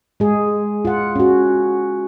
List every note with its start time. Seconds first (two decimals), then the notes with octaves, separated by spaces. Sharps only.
0.20 G#3 G#4
0.85 F4 F#5
1.16 C#4 F#4